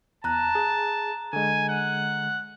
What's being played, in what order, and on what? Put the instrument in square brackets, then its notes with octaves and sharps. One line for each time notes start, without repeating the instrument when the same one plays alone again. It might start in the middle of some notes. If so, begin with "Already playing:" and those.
[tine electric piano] E2 [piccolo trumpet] A5 [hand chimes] A#5 F#6
[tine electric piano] G#4
[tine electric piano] D3 G#3 [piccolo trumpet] G#5
[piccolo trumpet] F#5